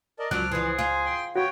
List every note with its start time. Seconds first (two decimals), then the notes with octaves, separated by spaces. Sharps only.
0.19 A#4 D5 D#5 A5
0.31 C#2 F3 F#3 D6 F6 F#6
0.51 E3 F3 G#4 C5
0.79 F4 C5 G#5
1.05 G5 C6
1.36 B3 F#4 C#5 G5